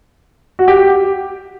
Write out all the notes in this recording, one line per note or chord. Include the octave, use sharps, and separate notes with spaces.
F#4
G4